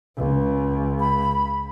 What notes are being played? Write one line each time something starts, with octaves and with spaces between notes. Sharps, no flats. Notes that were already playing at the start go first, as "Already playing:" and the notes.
C#2
B5